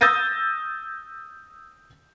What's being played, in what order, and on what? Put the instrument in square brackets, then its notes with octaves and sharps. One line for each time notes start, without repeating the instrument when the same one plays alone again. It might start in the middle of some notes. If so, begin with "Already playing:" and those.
[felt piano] D#6 E6 G6 A6 A#6 D#7